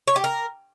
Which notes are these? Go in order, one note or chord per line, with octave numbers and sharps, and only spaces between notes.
C#5
G4
A#4